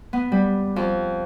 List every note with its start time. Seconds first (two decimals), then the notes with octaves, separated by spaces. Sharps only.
0.13 B3
0.32 G3
0.76 F2